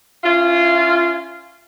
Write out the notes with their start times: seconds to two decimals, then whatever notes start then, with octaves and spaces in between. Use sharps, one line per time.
0.23 C#4 E4 F4